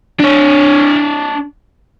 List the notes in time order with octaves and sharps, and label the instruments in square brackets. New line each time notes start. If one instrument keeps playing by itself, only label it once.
[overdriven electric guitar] D4 C#5